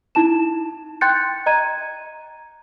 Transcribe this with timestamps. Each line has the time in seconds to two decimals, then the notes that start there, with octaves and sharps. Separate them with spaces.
0.15 D#4 E4 A5 E7
1.01 G5 C6 F#6 G6 A6 C#7
1.46 D#5 A#5 G#6 D#7